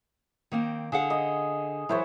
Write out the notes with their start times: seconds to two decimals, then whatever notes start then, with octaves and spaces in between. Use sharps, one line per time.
0.52 D#3 A#3 C4
0.92 D3 G#4 F5 F#5
1.10 D#5
1.89 E3 F#3 E4 C5 C#5